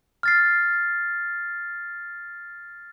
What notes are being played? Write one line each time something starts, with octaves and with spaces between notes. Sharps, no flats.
F6 A6 C7